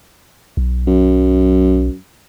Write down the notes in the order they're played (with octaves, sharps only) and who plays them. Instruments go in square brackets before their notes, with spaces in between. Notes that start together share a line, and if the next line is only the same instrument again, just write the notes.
[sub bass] B1
[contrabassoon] F#2